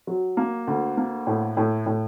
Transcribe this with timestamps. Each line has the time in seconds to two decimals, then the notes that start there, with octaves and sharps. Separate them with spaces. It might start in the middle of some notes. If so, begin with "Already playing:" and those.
0.07 F#3
0.37 A#3
0.67 D2
0.97 A#3
1.27 A2
1.57 A2
1.86 A2